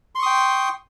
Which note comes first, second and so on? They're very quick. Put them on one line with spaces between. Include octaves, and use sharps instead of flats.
C6 C#6 D#6 G5